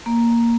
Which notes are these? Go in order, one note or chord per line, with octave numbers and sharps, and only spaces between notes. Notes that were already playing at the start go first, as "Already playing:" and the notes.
A#3